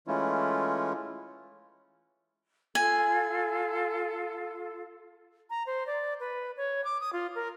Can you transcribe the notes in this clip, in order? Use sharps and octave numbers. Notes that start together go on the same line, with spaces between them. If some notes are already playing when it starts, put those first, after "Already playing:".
E3 G#3 A3 C#4 E4 F4
F4 A4 G#5
A#5
C5
D5
B4
C#5
D6
D#6
F4
A#4